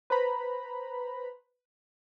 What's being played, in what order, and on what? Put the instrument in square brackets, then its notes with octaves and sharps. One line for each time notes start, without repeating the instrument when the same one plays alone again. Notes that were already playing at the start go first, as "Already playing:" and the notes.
[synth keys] B4 C5 A#5 B5